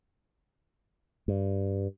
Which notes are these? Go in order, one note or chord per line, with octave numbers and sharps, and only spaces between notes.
G2